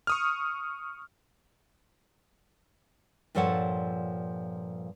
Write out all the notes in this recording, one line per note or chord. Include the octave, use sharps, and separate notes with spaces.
C#6 D#6 F6
G2 A#2 F3 A4 C#5 F#5